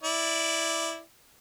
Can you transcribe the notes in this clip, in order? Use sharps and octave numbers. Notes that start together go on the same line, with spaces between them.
E4 D5